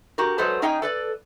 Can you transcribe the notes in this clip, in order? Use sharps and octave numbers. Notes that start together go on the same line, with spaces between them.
F#4 G4 A#4
F#3 G#3 A4 B4 C5
C#4 D#4 G#4 D#5 G5 G#5
A4 B4 D5